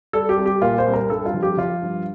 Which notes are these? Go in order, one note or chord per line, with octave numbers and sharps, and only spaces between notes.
G3 A4
G4
C2
G4
A#2 F4
C5
C2
A#4
G2 A4
F4
F3
G4
F3 F4
G2